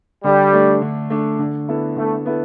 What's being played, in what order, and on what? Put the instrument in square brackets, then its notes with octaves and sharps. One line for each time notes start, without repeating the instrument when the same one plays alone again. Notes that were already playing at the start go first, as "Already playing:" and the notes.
[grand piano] D3 [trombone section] G3
[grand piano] A3 D4
D3
A3 D4
D3
B3 E4 A4
[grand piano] D3 [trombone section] A3
[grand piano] B3 E4 A4